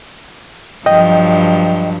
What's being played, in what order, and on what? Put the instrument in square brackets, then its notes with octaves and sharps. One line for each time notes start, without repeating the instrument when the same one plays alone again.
[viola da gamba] G2 F3 F#3 [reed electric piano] D#5 G5